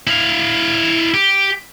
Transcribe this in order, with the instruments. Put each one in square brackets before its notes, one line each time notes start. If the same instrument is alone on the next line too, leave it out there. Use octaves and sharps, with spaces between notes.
[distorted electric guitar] E4 F5
G4